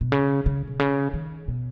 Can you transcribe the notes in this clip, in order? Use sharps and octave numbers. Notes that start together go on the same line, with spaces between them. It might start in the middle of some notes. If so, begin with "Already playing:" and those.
B2
C#3
C#3
B2
C#3
D#3
B2